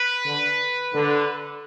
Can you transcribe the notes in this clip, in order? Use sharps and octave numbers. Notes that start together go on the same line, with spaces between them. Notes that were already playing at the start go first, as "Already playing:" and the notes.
Already playing: B4
D3
D3